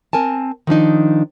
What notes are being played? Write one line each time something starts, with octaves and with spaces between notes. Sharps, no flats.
C4 A#4 G#5 A5
D#3 F3 D4 D#4